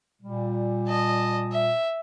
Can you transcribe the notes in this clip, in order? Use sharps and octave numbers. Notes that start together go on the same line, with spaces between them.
A#2 G3
D#5 A5
E5